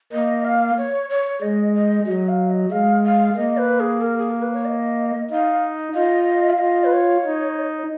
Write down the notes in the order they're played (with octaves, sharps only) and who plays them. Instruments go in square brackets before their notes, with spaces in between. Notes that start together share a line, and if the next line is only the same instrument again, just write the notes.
[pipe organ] A#3 [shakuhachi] D#5
[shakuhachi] F5
C#5
C#5
[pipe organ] G#3 [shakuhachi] D#5
[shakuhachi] D#5
[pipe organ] F#3 [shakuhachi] D#5
[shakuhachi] F5
D#5
[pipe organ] G#3 [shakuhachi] F5
[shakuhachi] F5
[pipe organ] A#3 [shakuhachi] D#5
[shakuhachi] B4
G#4
A#4
G#4
A#4
B4
C#5
D#5
[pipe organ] D#4 [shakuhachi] F5
[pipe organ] F4 [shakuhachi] D#5
[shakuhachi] F5
[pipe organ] F4 [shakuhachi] D#5
[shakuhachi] B4
C#5
[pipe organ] D#4